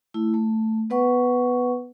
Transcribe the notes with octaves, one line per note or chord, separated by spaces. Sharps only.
A3 E4
A3
B3 B4 F#5 C#6